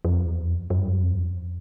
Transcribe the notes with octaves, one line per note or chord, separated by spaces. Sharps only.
F2
E2
F2
F#2
G2
F#2
F2
E2
F2